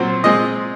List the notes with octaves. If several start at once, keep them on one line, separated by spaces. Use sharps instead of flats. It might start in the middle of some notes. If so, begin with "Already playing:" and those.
Already playing: A#2 F#3 C4 C5
A#2 G#3 C4 D#5